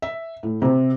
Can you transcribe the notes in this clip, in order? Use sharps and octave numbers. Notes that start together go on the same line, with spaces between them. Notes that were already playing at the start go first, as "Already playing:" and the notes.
E5
A2
C3